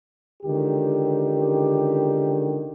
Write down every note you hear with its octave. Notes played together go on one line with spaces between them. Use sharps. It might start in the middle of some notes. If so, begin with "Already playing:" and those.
C#2 D3 D#3 G4